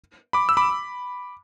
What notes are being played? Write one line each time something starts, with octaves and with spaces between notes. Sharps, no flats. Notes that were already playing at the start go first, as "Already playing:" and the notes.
B5 D6
E6
B5 D6